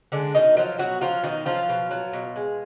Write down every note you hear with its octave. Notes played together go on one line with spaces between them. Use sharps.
D3 G#3 D4
B2 D#3 D#4
F3 F#3 F4
B2 F#3 F#4
F3 F#3 F4
B2 D#3 D#4
F3 F#3 F4
B2
F#3
B2
G#3